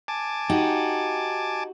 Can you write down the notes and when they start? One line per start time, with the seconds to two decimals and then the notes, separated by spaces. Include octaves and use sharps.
0.08 G#5 A5 D6
0.50 D#4 F#4 G4